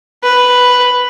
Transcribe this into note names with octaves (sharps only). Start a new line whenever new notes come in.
B4